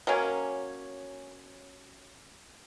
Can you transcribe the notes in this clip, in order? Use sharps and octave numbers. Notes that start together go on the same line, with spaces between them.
F#3 A#3 C#4